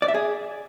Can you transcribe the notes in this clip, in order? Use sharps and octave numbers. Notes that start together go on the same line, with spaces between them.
D5
E5
G#4